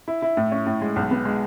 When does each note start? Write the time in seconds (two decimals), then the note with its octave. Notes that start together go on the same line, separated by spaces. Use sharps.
0.08 E4
0.22 E4
0.37 A2
0.51 C#4
0.67 A2
0.81 G#3
0.96 B1
1.11 B3
1.25 G#3